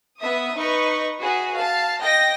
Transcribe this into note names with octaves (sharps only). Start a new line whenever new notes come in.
B3 E5 D#6
D#4 B4 C#6
F#4 G#4 B4
F5 A5
D#5 G5 A#6